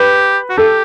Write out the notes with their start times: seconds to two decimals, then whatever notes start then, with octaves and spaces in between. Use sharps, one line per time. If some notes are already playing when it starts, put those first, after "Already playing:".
Already playing: G4 B4
0.50 F#4
0.57 G4 A4